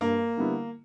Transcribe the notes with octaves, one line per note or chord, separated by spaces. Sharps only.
G2 A#3
D3 G3 B3 E4